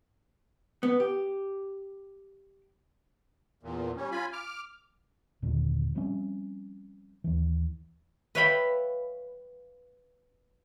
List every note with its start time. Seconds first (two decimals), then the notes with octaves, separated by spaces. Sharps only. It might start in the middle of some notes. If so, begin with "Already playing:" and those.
0.83 B3
1.00 G4
3.63 E2 A#2
3.96 G3 C#4
4.11 F4 G#5 B5
4.32 D6 F6
5.42 F#1 D#2 A#2 D3
5.95 F3 G3 C4 C#4
7.24 D#2 E3
8.35 B4 C#5 E5 F5 G5 B5